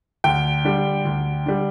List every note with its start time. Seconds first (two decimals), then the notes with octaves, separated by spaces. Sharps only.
0.24 D2 G5
0.65 D3 G3
1.05 D2
1.46 D3 G3